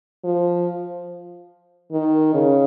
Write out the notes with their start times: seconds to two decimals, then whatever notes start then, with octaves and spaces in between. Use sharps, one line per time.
0.24 F3
1.92 D#3
2.34 C#3